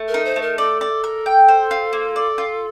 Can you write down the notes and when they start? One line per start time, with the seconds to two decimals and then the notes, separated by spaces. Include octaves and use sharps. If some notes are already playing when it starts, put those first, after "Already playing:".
Already playing: A3
0.08 A#4
0.14 D#4
0.25 C5
0.36 A3
0.42 A#4
0.58 A4 D5
0.81 D5
1.04 A#4
1.26 G5
1.48 C5
1.71 F4
1.93 A#3
2.16 D5
2.38 F4